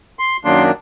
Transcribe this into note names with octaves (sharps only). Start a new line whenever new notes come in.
C6
F#2 D#3 F#3 A#3 D4 C6